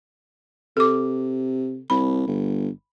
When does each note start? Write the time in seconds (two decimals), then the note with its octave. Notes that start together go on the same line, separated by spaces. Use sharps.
0.77 C3 A4 D6
1.90 C2 B5
2.27 G1